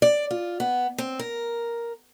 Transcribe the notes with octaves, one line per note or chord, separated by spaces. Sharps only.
D5
F4
B3
C4
A#4